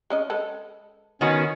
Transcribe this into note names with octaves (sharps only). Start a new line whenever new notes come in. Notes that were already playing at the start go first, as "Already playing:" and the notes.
G#3 C#4 D#5
G#3 A4 B4
D#3 B3 C#4 F#4